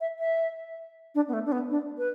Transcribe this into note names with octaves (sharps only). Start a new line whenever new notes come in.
E5
E5
D4
B3
A3
D4
B3
D4
B4